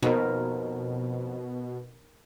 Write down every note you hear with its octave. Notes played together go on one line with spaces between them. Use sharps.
F2 B2 D#4 A#4